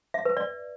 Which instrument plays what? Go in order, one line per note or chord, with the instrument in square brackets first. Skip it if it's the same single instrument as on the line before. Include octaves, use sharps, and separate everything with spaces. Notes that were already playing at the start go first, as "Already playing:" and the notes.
[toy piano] E5
B4
D5